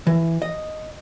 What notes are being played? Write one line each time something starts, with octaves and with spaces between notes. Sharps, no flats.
E3
D#5